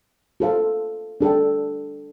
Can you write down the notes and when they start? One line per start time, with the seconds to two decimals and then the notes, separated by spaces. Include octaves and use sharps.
0.40 F4 A4 C5 F5
1.21 D4 A4 D5 G5